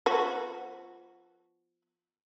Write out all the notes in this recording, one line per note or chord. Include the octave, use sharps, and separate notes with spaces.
F3 B3 F#4